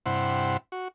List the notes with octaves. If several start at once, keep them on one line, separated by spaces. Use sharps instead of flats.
G2 C3 E4 C5 F#5
F#4